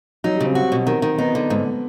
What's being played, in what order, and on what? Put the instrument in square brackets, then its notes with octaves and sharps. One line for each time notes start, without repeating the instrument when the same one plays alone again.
[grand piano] F#3 [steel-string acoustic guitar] D#4
[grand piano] G3
[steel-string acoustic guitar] C#3 [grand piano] C4
[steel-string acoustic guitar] F#4
B2
D#3
D#3
[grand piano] B3 [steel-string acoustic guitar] D#4
[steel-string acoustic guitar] D3
G#2